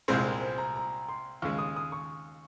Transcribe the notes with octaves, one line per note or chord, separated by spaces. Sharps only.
C2 A#2 G#3 C4 C5
A#4
C5
A#5
A#5
C6
D#2 C#3 G#3 C#6
D#6
D#6
C#6